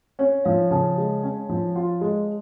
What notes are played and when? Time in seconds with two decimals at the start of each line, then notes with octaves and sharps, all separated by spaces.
0.19 C#4 C#5
0.45 F3 F5
0.71 C#3 A5
0.97 G#3
1.23 C#4
1.49 F3
1.75 F4
2.01 G#3